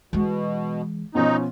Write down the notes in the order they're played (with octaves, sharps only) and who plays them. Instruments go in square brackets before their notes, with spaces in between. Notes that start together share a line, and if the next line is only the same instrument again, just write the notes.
[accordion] B2 [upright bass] E3 G#3
[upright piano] B2 F3 C#4 [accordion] D#4